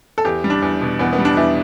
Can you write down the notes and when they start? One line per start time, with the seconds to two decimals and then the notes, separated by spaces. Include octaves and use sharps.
0.18 A4
0.25 E2 G4
0.44 G3
0.50 D4
0.62 E2
0.81 B2
0.99 E2 B3
1.13 B3
1.19 G3
1.25 D4
1.37 E2 E4